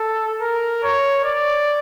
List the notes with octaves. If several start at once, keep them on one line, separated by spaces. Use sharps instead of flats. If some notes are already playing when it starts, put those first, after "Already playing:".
Already playing: A4
A#4
C#5
D5